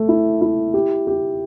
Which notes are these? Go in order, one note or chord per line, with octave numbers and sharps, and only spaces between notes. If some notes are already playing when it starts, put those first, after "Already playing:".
Already playing: A3
E4
E4
G4
G4